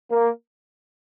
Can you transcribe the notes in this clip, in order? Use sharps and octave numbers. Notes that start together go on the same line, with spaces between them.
A#3